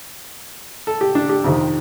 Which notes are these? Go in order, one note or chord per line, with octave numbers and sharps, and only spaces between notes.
A4
G4
D4
G4
F2 C3 D#3